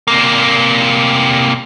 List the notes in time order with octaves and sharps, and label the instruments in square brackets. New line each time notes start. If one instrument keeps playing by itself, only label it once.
[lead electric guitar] C3 A#3